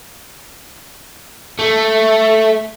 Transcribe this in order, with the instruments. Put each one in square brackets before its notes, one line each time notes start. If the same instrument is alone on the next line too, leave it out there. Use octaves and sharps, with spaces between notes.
[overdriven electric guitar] A3